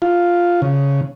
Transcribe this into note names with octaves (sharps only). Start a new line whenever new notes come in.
F4
C#3